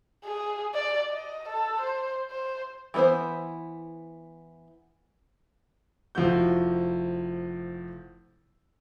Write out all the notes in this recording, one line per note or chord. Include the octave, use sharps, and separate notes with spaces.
G#4
D5
D#5
A4
C5
C5
E3 G3 B3 E4 C5
F1 F3 E4 F#4 G6